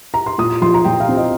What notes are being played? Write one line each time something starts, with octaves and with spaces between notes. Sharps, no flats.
A#5
C6
A#2 D#6
F3 C6
A#5
A#2 G5
F5
C4
D#5